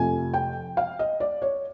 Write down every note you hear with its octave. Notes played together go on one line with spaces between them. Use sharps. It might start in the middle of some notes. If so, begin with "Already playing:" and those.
Already playing: F2 C3 F3 A3 G#5
G5
F5
D#5
D5
C#5